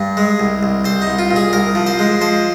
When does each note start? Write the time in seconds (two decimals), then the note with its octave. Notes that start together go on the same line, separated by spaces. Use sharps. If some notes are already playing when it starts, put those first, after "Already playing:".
Already playing: G2
0.17 G#3
0.40 C2
0.63 C2
0.85 C2 C5
1.02 D#4
1.07 C2
1.19 F4
1.31 A#2
1.36 G#4
1.53 C2 A#4
1.75 F3
1.87 C5
1.99 G#3
2.21 F3 C5